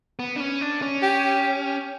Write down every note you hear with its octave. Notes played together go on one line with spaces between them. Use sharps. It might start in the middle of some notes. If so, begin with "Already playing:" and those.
B3
D4
C#4
D4
C#4
G4